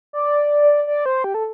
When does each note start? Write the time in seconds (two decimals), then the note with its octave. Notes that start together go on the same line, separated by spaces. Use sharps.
0.13 D5
0.87 D5
1.06 C5
1.24 G4
1.34 A4